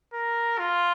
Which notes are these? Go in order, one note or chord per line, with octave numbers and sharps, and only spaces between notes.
A#4
F4